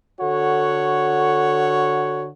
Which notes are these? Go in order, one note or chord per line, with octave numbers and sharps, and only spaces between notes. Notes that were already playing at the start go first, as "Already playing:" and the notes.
D3 F#4 A4 C#5 F#5